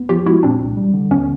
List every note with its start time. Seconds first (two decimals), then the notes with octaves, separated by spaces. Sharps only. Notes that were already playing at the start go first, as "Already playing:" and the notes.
Already playing: B3
0.09 F3 F4 G4
0.26 G#3 E4 F#4
0.43 A#2 C4 D4
0.60 C2
0.77 G3
0.94 D3
1.11 D#2 B3 C#4